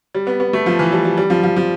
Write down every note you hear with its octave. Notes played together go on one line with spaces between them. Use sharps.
G3
B3
B3
A3
F3
E3
G3
G3
G3
F3
F3
F3